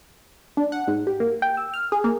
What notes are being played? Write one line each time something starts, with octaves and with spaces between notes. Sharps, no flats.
D4
F#5
G#2
G4
A#3
G5
E6
F6
G#4
A#3